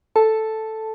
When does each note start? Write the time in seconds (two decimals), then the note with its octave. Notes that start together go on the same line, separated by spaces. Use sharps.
0.16 A4 A5